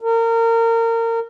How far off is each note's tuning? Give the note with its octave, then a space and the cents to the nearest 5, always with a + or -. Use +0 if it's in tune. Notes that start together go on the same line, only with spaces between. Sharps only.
A#4 -25